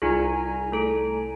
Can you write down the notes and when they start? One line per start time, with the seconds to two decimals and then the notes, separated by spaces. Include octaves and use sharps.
0.02 C2 D#4 F4 G#4 G#5 A#5
0.72 A3 A4 D7